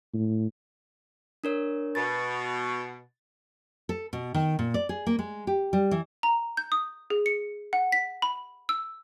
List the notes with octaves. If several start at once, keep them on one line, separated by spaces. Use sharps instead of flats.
A2
D4 A#4 C#5
B2 A6
A4
B2
D#3
A#2
D5
G#4
A#3
G#3
G4
G3
E3
A#5
G6
D#6
G#4
C#7
F#5
B6
B5
E6